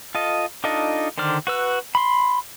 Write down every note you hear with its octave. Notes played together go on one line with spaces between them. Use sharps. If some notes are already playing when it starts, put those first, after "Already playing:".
F4 A4 D#5
D4 D#4 F4 A4 D#5
D3 D#3 C5 D5 F6
F#4 B4 E6
B5 C6